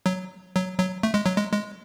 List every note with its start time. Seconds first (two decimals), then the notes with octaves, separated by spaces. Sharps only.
0.06 F#3
0.56 F#3
0.79 F#3
1.03 A3
1.14 G#3
1.26 F#3
1.37 G#3
1.52 G#3